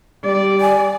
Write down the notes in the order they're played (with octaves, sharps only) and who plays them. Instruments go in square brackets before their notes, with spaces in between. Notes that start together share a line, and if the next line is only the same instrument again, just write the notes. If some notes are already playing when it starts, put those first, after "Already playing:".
[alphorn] G3 [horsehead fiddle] D5
[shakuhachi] G#5